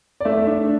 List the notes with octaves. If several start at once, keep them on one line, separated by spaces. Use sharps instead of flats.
D5
A3 E5
D4